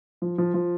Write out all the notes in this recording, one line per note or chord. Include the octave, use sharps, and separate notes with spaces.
F3
F3
F3